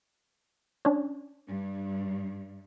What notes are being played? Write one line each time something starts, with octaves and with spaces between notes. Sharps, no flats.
C#4 D4
G2